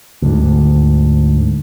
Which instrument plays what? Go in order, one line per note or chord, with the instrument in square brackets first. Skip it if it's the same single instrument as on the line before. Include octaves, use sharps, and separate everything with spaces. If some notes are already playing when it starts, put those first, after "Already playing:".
[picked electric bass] D2 G#2